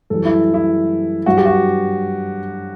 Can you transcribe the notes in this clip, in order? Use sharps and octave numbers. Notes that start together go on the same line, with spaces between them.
F#2 E3 G3 A4
E4
E4
G2 F#3 F#4
G4
F#4